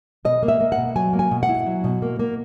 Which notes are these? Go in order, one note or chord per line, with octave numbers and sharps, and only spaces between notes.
B2 D#5
A#3
E5
A#3
F#5
B2
F#3 G#5
A#3
G#5
B2
F#5
E4
F#3
B2
A#3
A#3